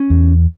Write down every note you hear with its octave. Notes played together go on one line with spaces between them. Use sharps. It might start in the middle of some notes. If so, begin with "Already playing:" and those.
Already playing: C#4
E2